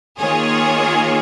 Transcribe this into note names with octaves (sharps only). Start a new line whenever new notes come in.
D#3 A#3 F4 G#4 C#5